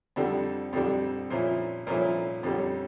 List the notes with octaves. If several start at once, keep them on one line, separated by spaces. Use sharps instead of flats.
F2 D3 G3 D4
F2 D3 G3 D4
A#2 F3 C#4 E4
A#2 F3 C#4 E4
F2 D3 G3 C#4